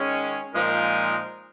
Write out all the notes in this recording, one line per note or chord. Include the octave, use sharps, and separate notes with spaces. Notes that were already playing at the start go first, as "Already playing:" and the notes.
Already playing: D#3 G#3 C#4
A#2 F3 G#3 D#4 A#4